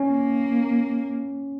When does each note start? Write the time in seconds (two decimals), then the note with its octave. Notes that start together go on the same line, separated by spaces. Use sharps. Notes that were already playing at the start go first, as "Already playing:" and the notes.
Already playing: C#4
0.09 A#3